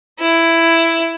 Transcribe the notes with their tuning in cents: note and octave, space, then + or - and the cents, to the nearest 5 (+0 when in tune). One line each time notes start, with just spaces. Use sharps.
E4 +5